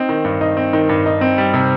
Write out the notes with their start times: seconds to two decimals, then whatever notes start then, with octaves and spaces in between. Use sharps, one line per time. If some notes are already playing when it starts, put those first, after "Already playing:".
Already playing: C4 D#4
0.09 D#3
0.24 G2
0.41 D#4
0.57 C4
0.73 D#3
0.89 G2
1.06 D#4
1.21 C4
1.38 G3
1.54 C3